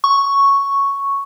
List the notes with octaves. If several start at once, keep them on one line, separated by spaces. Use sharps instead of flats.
C#6